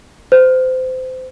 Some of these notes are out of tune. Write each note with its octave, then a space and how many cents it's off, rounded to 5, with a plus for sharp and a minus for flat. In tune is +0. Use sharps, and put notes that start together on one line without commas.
C5 -25